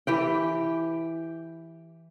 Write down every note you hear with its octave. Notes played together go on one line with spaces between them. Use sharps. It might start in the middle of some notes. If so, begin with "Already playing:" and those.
E3 G4 G5